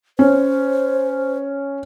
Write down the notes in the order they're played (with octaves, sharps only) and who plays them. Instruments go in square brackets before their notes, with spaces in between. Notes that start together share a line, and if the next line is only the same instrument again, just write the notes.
[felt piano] C#4 [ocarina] C5